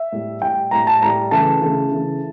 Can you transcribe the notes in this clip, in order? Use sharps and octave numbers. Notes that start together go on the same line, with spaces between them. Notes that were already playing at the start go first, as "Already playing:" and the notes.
Already playing: E5
A2 G3
A2 G3 G5
A2 G3 A#5
A5
A2 G3 A#5
C#3 E3 A3 A5
C#3 E3 A3
C#3 E3 A3